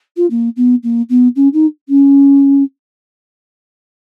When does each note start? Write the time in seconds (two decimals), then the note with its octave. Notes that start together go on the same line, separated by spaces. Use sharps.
0.16 F4
0.30 A#3
0.56 B3
0.83 A#3
1.09 B3
1.36 C#4
1.53 D#4
1.88 C#4